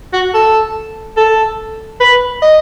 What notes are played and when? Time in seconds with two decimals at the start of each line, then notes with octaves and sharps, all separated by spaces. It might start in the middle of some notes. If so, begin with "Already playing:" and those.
0.13 F#4
0.34 A4
1.17 A4
2.00 B4
2.42 D#5